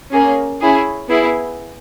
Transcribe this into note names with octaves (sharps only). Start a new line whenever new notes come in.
A#3 C#4 G#4
C#4 E4 G#4
B3 E4 G#4